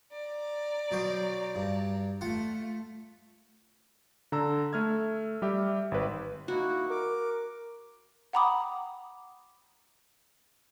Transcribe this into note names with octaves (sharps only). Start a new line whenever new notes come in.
D5 A#5
B2 F#3 C5
G2
A3 F4 F#5
D3 A#5 E6
A3 F6 G#6
G3 G4 E5
G#1 B4
A#3 D#4 E4 F#4
A#4 D6
F#5 G5 A#5 B5 D6 D#6